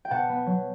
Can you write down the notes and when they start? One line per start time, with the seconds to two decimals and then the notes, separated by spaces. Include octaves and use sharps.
0.05 G5
0.10 B2 F#5 A5
0.29 B3
0.46 F#3